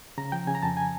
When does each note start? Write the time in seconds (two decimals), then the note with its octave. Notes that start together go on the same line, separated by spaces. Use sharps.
0.18 C#3 A#5
0.32 F3 G5
0.47 C#3 G#5
0.55 A#5
0.63 F2 A5
0.77 G#5